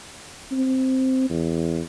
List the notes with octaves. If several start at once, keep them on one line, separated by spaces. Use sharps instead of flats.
C4
E2